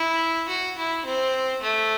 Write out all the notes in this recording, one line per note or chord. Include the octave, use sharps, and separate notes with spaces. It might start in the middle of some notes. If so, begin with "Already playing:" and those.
Already playing: E4
F#4
E4
C4
A3